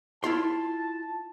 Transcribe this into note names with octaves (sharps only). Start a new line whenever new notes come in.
E4 F4 A5 C6